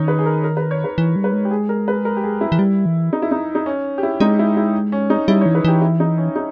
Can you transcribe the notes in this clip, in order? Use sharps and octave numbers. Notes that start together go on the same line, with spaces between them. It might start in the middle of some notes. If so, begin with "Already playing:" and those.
Already playing: D#3 C#4 D#4 C#5
B4
G#4
A#4
A#4
B4
C#5
B4
E3
G3
B4
G#3
G4
G#4
A#4
B4
A#4
G4
G#4
E4
E3
G3
E3
D#4
E4
D#4
D#4
C#4
G4
E4
G#3 D#4
E4
E4
C#4
D#4
G3 E4
E3 C#5
B4
E3 G4
E4
D#4
C#4
D#4